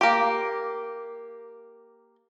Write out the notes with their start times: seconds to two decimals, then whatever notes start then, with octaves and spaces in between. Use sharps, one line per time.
0.01 A#3 G4